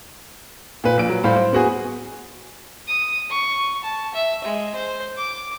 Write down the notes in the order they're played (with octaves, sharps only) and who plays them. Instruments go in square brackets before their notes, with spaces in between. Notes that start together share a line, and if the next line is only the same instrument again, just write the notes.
[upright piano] A#2 B4
A#1 D7
F#3
A2 G3 C5 F5 B5
C5
B3 F#4 G#4
[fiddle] D#6
C#6
A5
E5
G#3
C5
D6